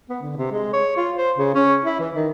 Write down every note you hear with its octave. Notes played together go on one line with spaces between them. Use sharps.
B3
D3
C3
G#3
C#5
F4
C5
C#3
C#4
E4
E3
D#3